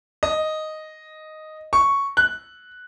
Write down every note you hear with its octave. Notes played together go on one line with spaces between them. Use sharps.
D#5
C#6
F#6